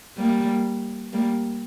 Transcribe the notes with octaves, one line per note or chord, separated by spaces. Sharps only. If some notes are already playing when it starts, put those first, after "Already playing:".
G3 A#3
G3 A#3